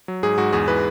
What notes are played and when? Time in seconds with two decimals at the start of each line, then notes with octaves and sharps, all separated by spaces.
0.08 F#3
0.23 G#2 G#4
0.37 G#2 F#4
0.53 E2 G#4
0.68 E3 B4